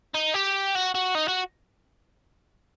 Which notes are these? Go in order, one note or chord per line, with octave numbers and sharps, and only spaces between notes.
D#4
G4
F#4
F#4
D#4
F#4